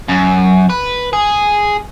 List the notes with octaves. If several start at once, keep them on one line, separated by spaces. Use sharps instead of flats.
F#2
B4
G#4